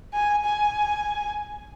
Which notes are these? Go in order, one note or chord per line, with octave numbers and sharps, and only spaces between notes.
G#5
G#5